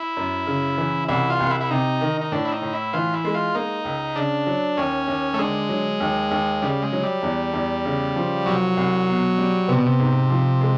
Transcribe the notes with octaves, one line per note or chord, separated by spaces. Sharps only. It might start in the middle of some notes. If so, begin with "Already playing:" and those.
Already playing: E4
F#2
C#3
E3
C2 E4
F4
C2
E4
E4
C3 D#4
D#3
D#4
A2 D4
E4
D#4
A2
E4
E3 F4
E4
G#3
F4
A#3 D#4
C#2
C#3 D4
F#3
D#2 C#4
D#2
A3
D3 G#3
F#3
D#2
D#2
C#3 G3
G#3
F#3
G3
E2
E2
C#3
F3
C2 F#3
C2
B2
G3
C3 B3
B2
C3
G#2
F3
G#3